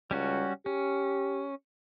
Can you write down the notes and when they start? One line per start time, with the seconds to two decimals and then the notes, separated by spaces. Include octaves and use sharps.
0.11 C#2 G3 C#4 F#4
0.66 C#4 G4